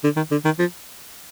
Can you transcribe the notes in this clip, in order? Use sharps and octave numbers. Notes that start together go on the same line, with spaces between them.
D3
D#3
D3
D#3
F3